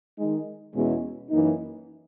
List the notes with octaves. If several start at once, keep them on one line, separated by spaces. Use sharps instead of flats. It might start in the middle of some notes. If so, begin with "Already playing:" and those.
D#3 G#3 D#4
E2 B2 G#3 C#4 E4
F#2 E3 A#3 D#4